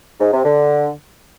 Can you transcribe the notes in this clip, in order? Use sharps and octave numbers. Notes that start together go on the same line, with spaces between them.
G#2
C3
D3